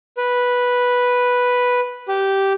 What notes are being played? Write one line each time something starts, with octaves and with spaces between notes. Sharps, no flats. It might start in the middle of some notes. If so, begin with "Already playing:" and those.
B4
G4